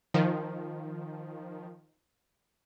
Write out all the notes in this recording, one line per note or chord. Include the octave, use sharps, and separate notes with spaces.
D#3 F3